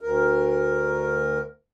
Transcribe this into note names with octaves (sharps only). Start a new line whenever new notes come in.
D2 A#4